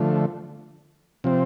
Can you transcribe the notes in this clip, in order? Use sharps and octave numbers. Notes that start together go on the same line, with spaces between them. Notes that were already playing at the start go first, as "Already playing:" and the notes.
Already playing: D3 F3 A3
C3 F3 C4